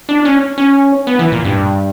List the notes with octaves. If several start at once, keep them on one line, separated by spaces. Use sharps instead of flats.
D4
C#4
C#4
B3
E3
A#2
G2